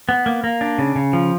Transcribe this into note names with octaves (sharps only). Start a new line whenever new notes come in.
B3
A#3
A#3
D4
C#3
C#3
F3